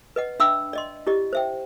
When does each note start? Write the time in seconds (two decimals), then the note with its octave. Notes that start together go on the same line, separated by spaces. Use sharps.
0.16 B4 D#5 F#5
0.39 D4 E5 G5 B5 E6
0.73 D5 D#5 C6
1.07 E4 G4 D5 D#5
1.33 C5 E5 G5